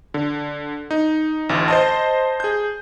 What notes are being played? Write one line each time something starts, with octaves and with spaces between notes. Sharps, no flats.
D3
D#4
A1 D2
C5 D#5 A5
G#4 G6